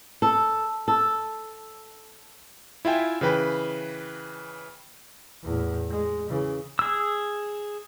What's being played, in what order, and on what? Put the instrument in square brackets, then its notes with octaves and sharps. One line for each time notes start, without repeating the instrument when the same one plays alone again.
[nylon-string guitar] A4
A4
[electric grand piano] E4 F4 E5 G5 G#5
C#3 E3 B4 G5 B5
[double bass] E2 A2
G#3
C#3 E3
[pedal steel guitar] G#4 E6